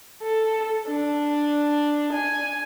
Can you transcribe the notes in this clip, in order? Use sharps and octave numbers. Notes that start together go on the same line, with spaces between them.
A4
D4
G#5